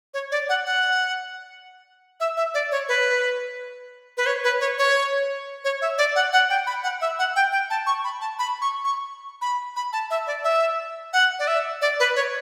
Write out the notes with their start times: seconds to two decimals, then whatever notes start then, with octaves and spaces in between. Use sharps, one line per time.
0.14 C#5
0.32 D5
0.49 F#5
0.66 F#5
2.20 E5
2.37 E5
2.54 D5
2.72 C#5
2.89 B4
4.17 B4
4.26 C#5
4.44 B4
4.61 C#5
4.78 C#5
5.64 C#5
5.82 E5
5.98 D5
6.16 F#5
6.33 F#5
6.50 G5
6.67 B5
6.83 F#5
7.01 E5
7.19 F#5
7.36 G5
7.52 G5
7.70 A5
7.86 C#6
8.04 B5
8.21 A5
8.39 B5
8.61 C#6
8.84 C#6
9.41 B5
9.76 B5
9.93 A5
10.10 E5
10.27 D5
10.44 E5
11.13 F#5
11.39 D5
11.48 E5
11.82 D5
12.00 B4
12.16 C#5